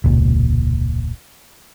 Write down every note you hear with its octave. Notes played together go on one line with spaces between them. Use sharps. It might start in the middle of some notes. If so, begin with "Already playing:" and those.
E1 C#2 A#2